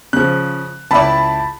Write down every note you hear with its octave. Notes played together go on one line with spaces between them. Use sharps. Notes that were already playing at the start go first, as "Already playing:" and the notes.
C#3 F3 F#6
C#2 E4 D5 A5 B5